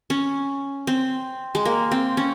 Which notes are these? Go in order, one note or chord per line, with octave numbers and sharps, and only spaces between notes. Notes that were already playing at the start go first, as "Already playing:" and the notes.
C#4
C4
G#3
A#3
C4
C#4